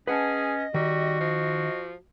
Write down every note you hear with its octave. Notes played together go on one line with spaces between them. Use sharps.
C#4 G#4 B4 D#5 F#5 A5
D#3 G3 F#4
F3